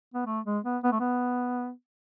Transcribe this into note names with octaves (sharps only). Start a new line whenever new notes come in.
B3
A3
G#3
B3
B3
A3
B3